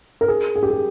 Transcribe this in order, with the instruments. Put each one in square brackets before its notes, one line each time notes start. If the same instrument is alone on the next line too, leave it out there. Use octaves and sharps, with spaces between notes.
[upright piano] A#4
G#4
G#4
G4
G#4